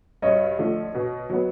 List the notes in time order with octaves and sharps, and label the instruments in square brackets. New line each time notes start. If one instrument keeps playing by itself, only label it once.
[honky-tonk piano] G2 [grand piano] C#5 D#5
[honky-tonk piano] D3 F3 A3
B2
F#3 B3